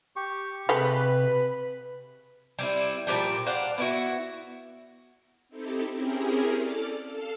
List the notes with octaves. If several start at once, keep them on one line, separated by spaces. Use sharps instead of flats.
G4 C#6
C3 G#3 A3 G4 B4 B5
G3 C4 E4
A#2 F3 G3 G5
C5 D5 F5 F#5
B3 E4 F#4
C4 D#4 E4 G4 A4
C4 C#4 E4 G4 G#4 A#4
A4 D5 F6 A6
A4 F5 A5 C7